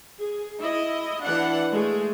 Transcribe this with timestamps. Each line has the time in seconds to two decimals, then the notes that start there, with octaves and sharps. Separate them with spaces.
0.20 G#4
0.60 E4 D#5
1.23 E3 D4 F#5
1.72 G#3 A3 G#4